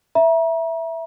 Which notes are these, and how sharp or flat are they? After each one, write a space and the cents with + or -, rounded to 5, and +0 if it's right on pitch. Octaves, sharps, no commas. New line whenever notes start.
E5 +0 A#5 +35